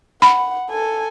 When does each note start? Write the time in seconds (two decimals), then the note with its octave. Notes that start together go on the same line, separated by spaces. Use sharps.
0.22 F#5 B5
0.70 A4 G#5